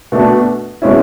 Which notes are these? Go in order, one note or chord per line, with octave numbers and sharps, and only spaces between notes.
B2 A3 D4
B2 G#3 C#4 E4